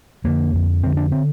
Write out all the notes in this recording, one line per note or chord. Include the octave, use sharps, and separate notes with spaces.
F2 D3 A#3
F2 D3
F2 D3 C4
D4
D3 C4